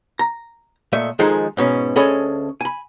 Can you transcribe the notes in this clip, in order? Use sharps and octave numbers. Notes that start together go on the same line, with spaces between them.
A#5
A#2 A3 D#5 E5
D#3 F3 G#3 D#4 G#4 A4
G#2 B2 C#4
D2 C#4 G#4 A4 D#5 B5
G#5 B5